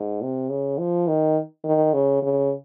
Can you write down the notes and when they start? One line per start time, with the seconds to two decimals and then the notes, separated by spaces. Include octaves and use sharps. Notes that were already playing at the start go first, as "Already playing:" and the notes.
Already playing: G#2
0.22 C3
0.50 C#3
0.79 F3
1.08 D#3
1.65 D#3
1.94 C#3
2.23 C#3